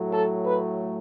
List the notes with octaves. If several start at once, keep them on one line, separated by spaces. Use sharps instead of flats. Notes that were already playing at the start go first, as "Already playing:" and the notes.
Already playing: A2 F#3 A3
A4
B4